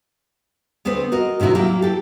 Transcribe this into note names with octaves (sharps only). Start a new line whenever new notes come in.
D2 B3 C4 B4 C5
F#4 A#4 D#5
A2 C3 D#3 E4 F#4
F#3 A#3 E4 G4
G4 A4